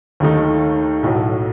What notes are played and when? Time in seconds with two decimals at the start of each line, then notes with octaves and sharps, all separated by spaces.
0.20 D#2 D#3 A3 D#4
1.03 B1 A2 F#3